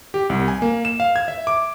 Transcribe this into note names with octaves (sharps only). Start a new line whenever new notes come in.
G4
C2
G#5
A#3
E7
F5
G#6
E5
D6